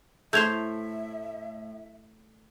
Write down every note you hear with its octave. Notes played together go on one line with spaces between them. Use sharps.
A2 A3 C5 E5 G6 G#6 F7